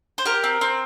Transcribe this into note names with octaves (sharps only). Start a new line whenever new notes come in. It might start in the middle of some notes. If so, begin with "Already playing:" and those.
C5
G4 A#4
C4
C4